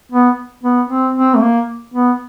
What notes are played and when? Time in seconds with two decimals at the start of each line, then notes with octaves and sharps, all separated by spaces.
0.12 B3
0.64 B3
0.90 C4
1.16 C4
1.35 A3
1.41 A#3
1.94 B3